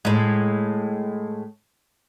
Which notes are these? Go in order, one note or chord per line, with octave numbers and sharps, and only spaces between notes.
A2 G#3